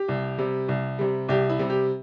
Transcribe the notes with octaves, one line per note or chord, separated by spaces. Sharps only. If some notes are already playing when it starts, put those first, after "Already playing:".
Already playing: G4
C2
C3 G3
C2
C3 G3
C2 G4
E4
C3 G3
G4